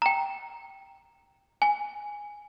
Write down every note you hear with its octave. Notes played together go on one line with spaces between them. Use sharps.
G5 A#5
G#5